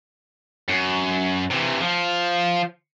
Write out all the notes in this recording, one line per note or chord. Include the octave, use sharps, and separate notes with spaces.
F#2
C3 E3
F3